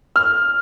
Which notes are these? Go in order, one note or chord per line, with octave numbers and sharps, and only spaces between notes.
F6